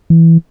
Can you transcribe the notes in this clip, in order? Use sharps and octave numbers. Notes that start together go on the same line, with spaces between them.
E3